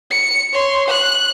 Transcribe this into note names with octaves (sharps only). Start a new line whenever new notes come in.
C#7
C#5 C6
F#6